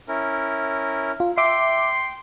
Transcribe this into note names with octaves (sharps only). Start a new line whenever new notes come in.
C#4 E4 A#4
F4
E5 G5 C6 D6